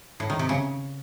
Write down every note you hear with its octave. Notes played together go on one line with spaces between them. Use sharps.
A2
D#3
C3
C#3